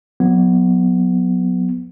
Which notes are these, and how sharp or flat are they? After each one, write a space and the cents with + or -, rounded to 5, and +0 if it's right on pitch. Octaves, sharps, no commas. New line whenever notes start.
F#3 -25 B3 +0